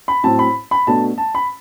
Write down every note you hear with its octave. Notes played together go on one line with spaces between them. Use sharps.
B5
A2 F#3 C4 A5
B5
B5
B2 A3 D4 A5
A5
B5